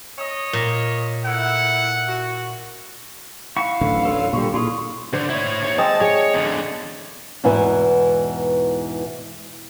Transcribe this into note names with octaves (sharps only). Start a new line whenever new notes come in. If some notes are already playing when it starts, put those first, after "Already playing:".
C#5 D#5
A#2
A3 E4 F#5
F#4
E4 F5 F#5 C#6
D1 A1 D3
F#3 F4 A4
A#2 D3 G3 C#6
A#2 E4 F4 G#4
D3 C5
E4 C#5
D#2 C#5
G#3 C4 D#5 A5 D#6
G#4 C#5 D5
E2 D3
E2 G#2 B2 E3 E4